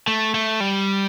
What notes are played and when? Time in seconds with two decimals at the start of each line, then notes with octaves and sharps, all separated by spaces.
0.08 A3
0.34 A3
0.60 G3